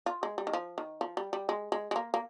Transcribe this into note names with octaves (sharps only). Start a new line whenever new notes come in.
F4
G#3
G3
D#3
F3
D#3
F3
G3
G3
G#3
G#3
G#3
A#3
A#3